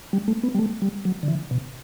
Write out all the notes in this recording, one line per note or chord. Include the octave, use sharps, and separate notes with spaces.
G3
A3
B3
G3
A3
G3
F#3
D3
E3
B2